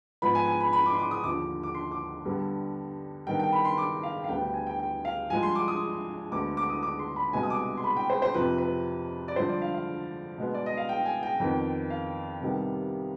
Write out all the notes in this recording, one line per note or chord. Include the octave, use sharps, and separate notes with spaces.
G#2 F3 B3 B5
G#5
G#5
B5
B5
D6
C6
D6
D#6
D#2 D3 F3 D6
D6
C6
D6
G2 D3 G3 B3
G2 D#3 B3 G5
G5
B5
C6
D6
F5
F5
D2 D3 G3 B3 G5
G5
G#5
G5
G5
F5
G2 F3 G#3 G#5
C6
D6
D#6
D2 D3 G#3 B3 D6
D6
D#6
D6
C6
B5
C2 B2 G#3 B3 G#5
D#6
D6
C6
B5
G5
C5
C5
F2 C3 F3 B4
B4
D5
G2 D3 F3 G#3 C5
D5
F5
F5
B2 G#3 B3
D5
D#5
F5
G5
G#5
G5
F2 D#3 B3
F5
C2 C3 D#3 G3 B3